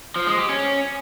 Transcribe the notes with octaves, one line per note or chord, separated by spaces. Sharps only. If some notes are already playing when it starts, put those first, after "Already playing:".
F3
G#3
G4
C#4